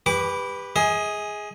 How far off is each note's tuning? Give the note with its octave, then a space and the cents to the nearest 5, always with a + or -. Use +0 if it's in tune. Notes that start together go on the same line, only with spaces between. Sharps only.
G4 +30 B4 +0 D6 -25
G#4 +0 D#5 +40